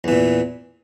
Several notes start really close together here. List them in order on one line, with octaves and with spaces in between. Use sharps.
E2 E3 A#2